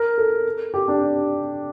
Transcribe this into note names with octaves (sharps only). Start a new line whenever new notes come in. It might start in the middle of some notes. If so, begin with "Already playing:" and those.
Already playing: A#4
A4
G4
D4